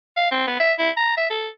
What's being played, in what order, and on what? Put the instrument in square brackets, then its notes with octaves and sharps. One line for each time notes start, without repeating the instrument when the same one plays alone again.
[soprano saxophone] F5
C4
B3
E5
E4
A#5
E5
A4